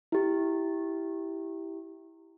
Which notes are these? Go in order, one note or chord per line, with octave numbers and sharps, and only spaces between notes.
E4 G4